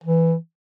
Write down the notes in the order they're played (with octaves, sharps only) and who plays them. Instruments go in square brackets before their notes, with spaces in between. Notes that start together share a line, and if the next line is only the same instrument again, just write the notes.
[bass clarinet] E3